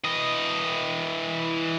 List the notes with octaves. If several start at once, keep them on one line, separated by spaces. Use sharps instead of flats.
E3 D#5